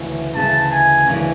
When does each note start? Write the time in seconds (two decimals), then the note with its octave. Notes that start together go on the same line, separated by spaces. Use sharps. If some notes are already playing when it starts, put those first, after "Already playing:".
Already playing: D2 C#3 E3
0.35 D2 C#3 E3 A5
0.71 G#5
1.08 D2 C#3 E3